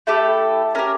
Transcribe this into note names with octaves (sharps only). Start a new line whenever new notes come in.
A3 E4 G4 A4
C#4 G4 A#4